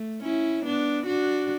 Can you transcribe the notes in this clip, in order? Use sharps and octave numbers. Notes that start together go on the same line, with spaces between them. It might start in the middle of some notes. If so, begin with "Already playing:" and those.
Already playing: A3
C#4 E4
B3 D4
D4 F#4